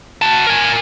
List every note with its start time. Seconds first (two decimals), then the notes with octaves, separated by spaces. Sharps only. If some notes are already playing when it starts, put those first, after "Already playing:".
0.22 F#4 A5
0.47 A#4 G#5